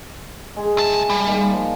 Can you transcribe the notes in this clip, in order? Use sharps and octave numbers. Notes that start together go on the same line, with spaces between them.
G#3 G#4
C2 E4 A5
G3
D#3 G#3 A#3
F3